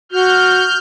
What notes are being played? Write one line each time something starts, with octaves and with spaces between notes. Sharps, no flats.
F#4 F6 G6